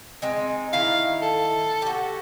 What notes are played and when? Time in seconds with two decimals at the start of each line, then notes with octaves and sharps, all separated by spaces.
0.22 G#3 C4 D#4
0.73 D#3 E4 F5
1.22 A4
1.82 F#4 G4